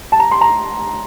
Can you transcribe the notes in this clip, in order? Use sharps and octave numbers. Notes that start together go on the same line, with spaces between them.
A5
A#5
C6
A#5